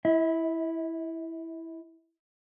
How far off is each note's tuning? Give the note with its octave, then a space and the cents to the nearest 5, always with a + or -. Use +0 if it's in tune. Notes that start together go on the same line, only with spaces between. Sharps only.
E4 +0 E5 -35